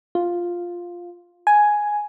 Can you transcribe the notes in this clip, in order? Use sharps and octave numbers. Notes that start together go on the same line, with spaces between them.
F4
G#5